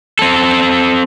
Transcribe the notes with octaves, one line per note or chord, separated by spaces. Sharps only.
C4 A4